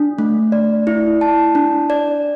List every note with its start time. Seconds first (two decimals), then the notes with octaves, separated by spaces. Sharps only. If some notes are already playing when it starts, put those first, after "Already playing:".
Already playing: D4
0.19 A3
0.52 D5
0.87 E4
1.21 A5
1.55 D4
1.90 D5